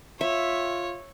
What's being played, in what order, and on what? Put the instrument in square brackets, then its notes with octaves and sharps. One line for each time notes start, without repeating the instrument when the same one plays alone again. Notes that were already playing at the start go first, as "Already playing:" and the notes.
[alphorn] F4 [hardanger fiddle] C#5 [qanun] E5